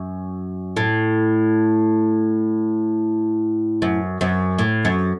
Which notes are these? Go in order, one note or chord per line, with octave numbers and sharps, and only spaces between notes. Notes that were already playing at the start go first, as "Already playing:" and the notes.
Already playing: F#2
A2
F#2
F#2
A2
F#2